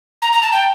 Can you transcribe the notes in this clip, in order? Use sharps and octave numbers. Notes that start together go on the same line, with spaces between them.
A#5
A#5
A5
G5